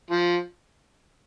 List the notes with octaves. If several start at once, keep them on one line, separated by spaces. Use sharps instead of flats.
F3